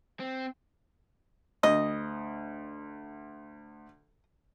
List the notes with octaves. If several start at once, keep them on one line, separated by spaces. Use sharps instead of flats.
C4
D2 D#5